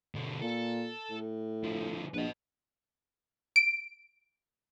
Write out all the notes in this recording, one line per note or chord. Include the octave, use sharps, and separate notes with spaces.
B2 D3
A#2 A4
A2
D3 F3
A#1 B4 D#5
D7